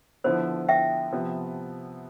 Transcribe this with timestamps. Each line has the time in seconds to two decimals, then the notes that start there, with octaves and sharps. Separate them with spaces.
0.24 D3 F3 B3 E4 C5
0.69 E5 G5
1.13 C3 F3 B3